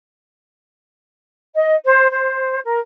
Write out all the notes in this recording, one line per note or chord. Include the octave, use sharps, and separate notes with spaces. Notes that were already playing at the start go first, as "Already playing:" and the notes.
D#5
C5
C5
A#4